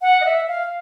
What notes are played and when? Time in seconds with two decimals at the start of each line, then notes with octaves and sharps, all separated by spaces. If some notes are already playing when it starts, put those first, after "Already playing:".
0.02 F#5
0.21 D#5
0.25 E5
0.48 F5